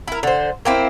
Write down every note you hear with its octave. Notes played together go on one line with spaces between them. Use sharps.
E4 A#4
D3 C5
A#3 C4 E4